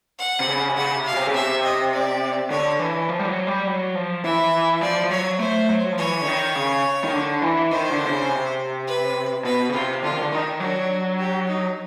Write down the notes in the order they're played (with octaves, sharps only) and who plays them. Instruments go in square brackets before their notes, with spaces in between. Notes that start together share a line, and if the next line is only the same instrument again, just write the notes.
[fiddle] F#5
[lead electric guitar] C3
C#3
C3
[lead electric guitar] C#3 [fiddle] F#5
[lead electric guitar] C3
[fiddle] F5
[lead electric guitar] B2
C3
C#3
[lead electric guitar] C3 [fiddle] E5
[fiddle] D#5
D5
[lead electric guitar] D3 [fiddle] C#5
[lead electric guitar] E3
F3
G3
F#3
G3
F#3
F3
[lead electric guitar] E3 [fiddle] E5
[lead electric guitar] F3 [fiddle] D5
[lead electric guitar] F3
[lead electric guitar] F#3 [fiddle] C#5
[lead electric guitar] A3 [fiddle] C5
[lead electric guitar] F#3
F3
[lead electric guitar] E3 [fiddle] C#5
[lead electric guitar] D3
D#3
C#3
D#3
D3
E3
[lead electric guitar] D#3 [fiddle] C5
[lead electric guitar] D3
C3
C#3
C3
[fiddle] B4
[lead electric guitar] B2 [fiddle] B4
[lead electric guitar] C#3
[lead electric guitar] C3 [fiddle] F4
[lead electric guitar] D3 [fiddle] F4
[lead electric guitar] D#3
D3
[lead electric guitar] D#3 [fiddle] D#4
[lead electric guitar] F#3 [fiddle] D4
[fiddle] G4
D#4